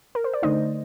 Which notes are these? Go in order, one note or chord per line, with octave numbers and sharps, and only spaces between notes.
A#4
C5
D5
D3 A3 D#4 C5 D#5